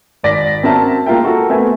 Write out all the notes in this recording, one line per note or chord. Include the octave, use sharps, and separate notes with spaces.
G#1 D5 A#6 B6
C4 C#4 F#4 A#4 E5 A5
G#3 A#3 F4 A#4 E5 G5
F#4 A4 A#4
A3 B3 C4 A#4 E5 G#5